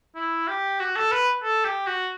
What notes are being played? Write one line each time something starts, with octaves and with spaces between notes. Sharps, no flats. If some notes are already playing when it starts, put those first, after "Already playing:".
E4
G4
F#4
A4
B4
A4
G4
F#4